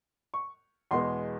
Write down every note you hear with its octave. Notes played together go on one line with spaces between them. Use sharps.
C#6
E2 B2 G#3 B3 C6